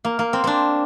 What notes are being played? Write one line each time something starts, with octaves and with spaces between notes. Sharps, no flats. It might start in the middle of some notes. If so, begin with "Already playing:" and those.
A#3
A#3
C4
C4 D4